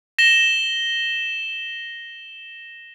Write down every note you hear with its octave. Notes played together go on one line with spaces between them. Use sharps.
A#6 E7 G7